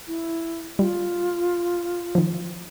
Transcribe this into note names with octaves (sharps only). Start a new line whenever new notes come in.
E4
G3 F4
D#3 F3